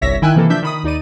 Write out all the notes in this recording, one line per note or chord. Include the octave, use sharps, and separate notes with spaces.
G1 C2 C#5 E5 A#6 B6
D#3 E4 G5 G#5 E6 F#6
C3 E3 A#3 A4
F3 D4 E5 G6 B6
D#3 B5 D#6
D#2 D#4 D5 D#7